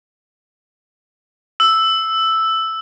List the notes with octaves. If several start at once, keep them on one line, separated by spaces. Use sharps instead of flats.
E6